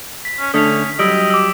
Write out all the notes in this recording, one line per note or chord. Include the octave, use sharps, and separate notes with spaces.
B6
C#4
D3 A3 C#4 D4 D#6 B6 F7
F#3 G3 D#5 D#6 E6 D7
D6 E6